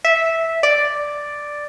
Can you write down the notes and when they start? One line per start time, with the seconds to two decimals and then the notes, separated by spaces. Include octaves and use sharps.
0.05 E5
0.63 D5